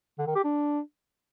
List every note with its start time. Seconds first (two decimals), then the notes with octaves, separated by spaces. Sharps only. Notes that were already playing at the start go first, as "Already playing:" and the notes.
0.18 D3
0.27 D#3
0.36 G4
0.44 D4